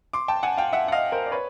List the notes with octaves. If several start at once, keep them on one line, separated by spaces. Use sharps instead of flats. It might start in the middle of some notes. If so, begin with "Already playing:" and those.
C6 D6
G5 A5
F#5 G#5
F5 G5
E5 F#5
F#5
D#5 F5
A#4 C5
D5
B4 C#5